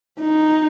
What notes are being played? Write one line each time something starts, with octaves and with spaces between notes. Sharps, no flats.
D#4